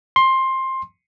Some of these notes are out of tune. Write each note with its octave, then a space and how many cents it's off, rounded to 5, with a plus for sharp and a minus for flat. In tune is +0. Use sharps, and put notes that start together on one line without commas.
C6 +15